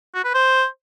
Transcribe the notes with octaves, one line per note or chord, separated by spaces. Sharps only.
F#4
B4
C5